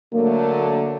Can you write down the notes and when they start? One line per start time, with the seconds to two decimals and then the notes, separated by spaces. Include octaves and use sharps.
0.13 D3 F#3 A3 A#3